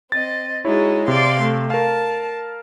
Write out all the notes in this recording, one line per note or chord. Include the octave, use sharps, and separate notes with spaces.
C4 D#5 A6
G#3 D#4 E4 F#4 C#5
C3 D5 F5 C6
A3
A#4 F5 A5